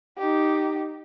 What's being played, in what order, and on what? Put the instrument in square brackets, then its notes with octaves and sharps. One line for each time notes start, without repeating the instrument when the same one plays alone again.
[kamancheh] D#4 G4